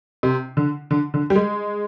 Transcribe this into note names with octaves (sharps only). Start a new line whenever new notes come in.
C3
D3
D3
D3
G3
G#3